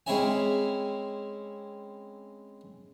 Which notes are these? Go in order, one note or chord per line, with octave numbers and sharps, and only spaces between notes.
G#3 C4 C#4 E4 C#5 G#5